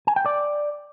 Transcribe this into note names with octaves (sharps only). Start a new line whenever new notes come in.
G#5
G5
D5